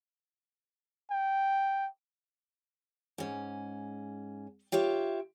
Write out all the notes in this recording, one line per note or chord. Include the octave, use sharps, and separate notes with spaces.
G5
G#2 C#4
F4 G4 C#5 E5